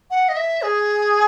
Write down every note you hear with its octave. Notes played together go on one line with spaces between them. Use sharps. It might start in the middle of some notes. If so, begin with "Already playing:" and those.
F#5
D#5
E5
G#4